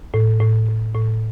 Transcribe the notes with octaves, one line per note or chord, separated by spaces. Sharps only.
A2
A2
A2
A2